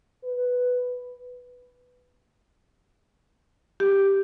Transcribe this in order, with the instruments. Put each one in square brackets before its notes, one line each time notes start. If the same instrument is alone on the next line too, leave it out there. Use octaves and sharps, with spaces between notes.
[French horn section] B4
[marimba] G4